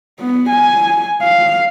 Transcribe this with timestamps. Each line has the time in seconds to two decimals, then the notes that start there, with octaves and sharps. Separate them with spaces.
0.19 B3
0.50 G#5
1.22 F5